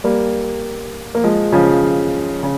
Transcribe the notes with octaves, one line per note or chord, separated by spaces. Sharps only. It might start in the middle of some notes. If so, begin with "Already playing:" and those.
G3 A#3
A#3
F3 G#3
C#3 F3
C#3